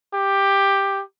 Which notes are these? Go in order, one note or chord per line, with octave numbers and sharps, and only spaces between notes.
G4